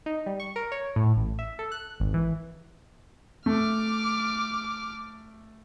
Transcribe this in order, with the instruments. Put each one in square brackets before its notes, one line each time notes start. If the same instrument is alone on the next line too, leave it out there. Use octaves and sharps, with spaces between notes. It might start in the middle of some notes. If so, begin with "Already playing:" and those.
[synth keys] D#4
G3
C#6
A#4
C#5
A2
A1
E5
A4
F#6
G#1
E3
[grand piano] A3 [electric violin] D6 F6